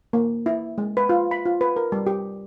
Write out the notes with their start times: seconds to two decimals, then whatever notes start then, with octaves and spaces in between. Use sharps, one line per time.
0.13 A#3
0.46 E4
0.78 G#3
0.97 B4
1.09 F4
1.31 B5
1.45 F4
1.61 B4
1.76 A#4
1.92 G3
2.07 G4